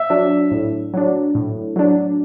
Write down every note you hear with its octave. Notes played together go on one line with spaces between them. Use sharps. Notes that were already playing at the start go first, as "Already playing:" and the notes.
Already playing: E5
F#3 D4
A2
F#3 D4
A2
F#3 D4